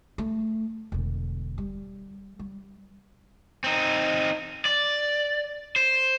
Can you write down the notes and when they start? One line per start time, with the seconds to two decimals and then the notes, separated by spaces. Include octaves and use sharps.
0.18 A3
0.92 E1 D3
1.58 G3
2.39 G3
3.64 C4 D#4
4.65 D5
5.76 C5